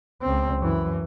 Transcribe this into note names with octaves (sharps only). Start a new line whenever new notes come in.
C#2 C4
F#2 E3